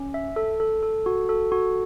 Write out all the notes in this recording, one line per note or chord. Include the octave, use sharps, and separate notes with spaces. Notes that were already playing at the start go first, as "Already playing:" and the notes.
Already playing: C#4
E5
A4
A4
A4
F#4
A4
F#4